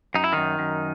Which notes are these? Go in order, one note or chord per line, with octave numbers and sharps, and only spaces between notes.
F#2 D#4
E4
F#2 D#3 D#4
F#2